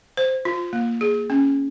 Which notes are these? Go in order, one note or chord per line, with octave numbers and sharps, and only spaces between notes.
C5
F4
A#3
G#4
C#4